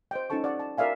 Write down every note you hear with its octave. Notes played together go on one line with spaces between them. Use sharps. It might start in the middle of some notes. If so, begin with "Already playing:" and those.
C5 D#5 G5
C#4 D#4 F4 A4 A5 C#6
D5 F#5 C#6
A5
F#4 A#4 D5 E5 F5 G#5